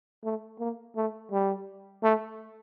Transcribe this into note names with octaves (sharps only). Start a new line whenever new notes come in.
A3
A#3
A3
G3
A3